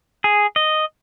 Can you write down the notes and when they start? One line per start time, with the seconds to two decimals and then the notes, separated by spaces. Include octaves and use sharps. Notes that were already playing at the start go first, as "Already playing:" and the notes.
0.24 G#4
0.56 D#5